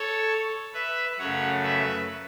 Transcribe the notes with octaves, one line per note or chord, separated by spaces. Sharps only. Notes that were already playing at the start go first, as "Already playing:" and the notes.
Already playing: A4 C#5
B4 E5
F#2 C#3 A3 C#5 F#5
B4 E5